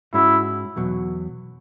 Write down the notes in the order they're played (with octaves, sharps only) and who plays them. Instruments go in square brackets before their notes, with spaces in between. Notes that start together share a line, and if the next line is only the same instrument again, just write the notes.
[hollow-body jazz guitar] G#2 G#3 C#4 F#4 [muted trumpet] E4
[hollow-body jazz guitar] E2 B2 F#3